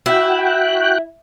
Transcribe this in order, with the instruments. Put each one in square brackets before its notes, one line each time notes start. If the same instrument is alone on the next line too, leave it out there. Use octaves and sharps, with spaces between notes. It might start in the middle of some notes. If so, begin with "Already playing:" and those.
[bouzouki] E4 [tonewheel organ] F#4 G5 F#6